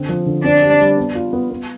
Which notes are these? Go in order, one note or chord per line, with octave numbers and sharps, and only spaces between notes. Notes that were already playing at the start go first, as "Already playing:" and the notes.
Already playing: D3 C4
F3
D3
C4 D4
G4
G3
B3
F4
B3
B3